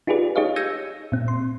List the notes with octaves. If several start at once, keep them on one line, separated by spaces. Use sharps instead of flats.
D#4 F4 G4 G#4 B4 D5
D#4 G4 G#4 C#5 D#5 F5
E6 G6 G#6 A#6 C#7 D#7
A#2 C4
C6